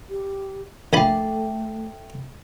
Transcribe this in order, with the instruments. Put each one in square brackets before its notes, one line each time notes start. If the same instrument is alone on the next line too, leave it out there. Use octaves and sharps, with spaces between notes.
[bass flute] G4
[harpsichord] A#1 G#5 B5 [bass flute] A3 [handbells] A4 E5 G5